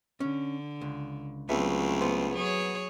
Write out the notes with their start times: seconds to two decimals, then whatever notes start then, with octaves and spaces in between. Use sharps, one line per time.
0.20 D3 C#4
0.81 C#2
1.49 C#2 F#3 A3 B3 C4 E5
2.01 B3 C5
2.33 F#3 G#4 C#5